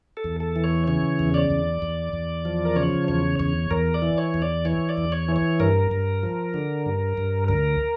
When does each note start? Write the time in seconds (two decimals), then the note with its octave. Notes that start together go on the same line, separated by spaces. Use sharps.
0.17 A4
0.24 E2
0.40 A4
0.56 E3
0.64 C#5
0.87 C#3 C#5
1.19 E2
1.34 D5
1.50 E2
1.82 E2
2.13 E2
2.45 F3
2.65 A#4
2.76 C#3 C#5
3.08 E2 C#5
3.39 E2 C#5
3.71 E2 A#4
3.94 D5
4.02 E3
4.18 C#5
4.34 E2
4.42 D5
4.65 E3 C#5
4.89 D5
4.97 E2
5.12 C#5
5.28 E3
5.36 C#5
5.60 G2 A#4
5.91 G2
6.23 F3
6.54 D3
6.86 G2
7.17 G2
7.48 D2 A#4